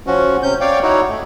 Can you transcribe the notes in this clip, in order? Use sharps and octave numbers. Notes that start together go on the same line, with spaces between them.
F3 C#4 F#4
C3 C#4 G6
C#5 D5 F5 G5
D#4 E4 F#4 C#5
A3